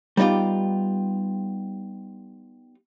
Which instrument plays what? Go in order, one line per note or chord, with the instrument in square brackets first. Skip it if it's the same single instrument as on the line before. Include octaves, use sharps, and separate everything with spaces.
[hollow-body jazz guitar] G3 B3 D#4 F4 G4